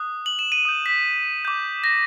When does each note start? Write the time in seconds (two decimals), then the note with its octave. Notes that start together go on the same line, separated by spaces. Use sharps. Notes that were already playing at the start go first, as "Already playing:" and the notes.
Already playing: D#6 F#6
0.26 F#7
0.39 E7
0.52 D#7
0.65 D#6 G6
0.86 B6
1.45 D6 G6
1.84 A#6